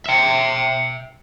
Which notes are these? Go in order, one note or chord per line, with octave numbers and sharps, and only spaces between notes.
E5 G5